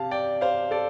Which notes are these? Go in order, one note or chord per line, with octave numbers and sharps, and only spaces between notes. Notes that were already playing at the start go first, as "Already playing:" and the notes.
Already playing: C3 F5 A5
D5 G5
C5 F5
A4 D5